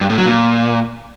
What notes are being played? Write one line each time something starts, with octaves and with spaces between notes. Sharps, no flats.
G2
A2
F#3
A#2